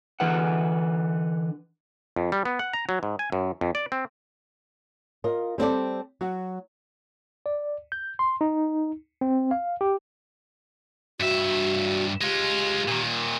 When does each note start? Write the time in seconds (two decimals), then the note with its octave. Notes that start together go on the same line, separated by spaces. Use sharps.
0.20 D3 E3 B4 F#5
2.16 F2
2.32 G3
2.45 B3
2.59 F#5
2.73 A#5
2.89 F#3
3.03 G#2
3.19 G#5
3.32 F#2
3.61 F2
3.75 D5
3.92 C4
5.24 F4 A#4 D#5
5.58 G3 C4 A4 D5
6.21 F#3 F#4
7.46 D5
7.92 G6
8.19 C6
8.41 D#4
9.21 C4
9.51 F5
9.81 G4
11.20 G2 F#4 E5
12.21 G#3 F4 G4
12.88 A#2 D#3